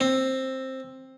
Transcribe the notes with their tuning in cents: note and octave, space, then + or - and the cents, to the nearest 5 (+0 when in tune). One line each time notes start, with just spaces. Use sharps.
C4 +10